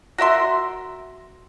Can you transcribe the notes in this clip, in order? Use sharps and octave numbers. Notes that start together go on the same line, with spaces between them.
F#4 A#4 E5 C6